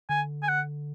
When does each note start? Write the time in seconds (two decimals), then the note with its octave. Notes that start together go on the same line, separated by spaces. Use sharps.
0.09 D3 G#5
0.43 G#5
0.49 F#5